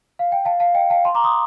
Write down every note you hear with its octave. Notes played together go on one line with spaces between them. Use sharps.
F5
G5
F5 A5
F5 A5
D#5 G5
F5 A5
A5 C6
A#5 D6
C6 D#6